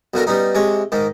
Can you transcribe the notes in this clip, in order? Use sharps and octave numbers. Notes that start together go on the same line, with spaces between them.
B1 D3 F#4 A#4
G3 B3 C#4 D#4
C3 G#3 C#5
G#2 D#3